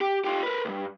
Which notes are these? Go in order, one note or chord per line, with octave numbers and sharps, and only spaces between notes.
G4
F4 G4
A#4 B4
C#2 G2